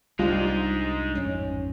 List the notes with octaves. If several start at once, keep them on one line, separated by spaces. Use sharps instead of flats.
C2 G3 G#3 D4 D#4 F4
A1 F2 G#2 C#4